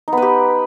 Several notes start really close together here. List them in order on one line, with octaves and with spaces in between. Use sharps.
D#4 B3 B4 G4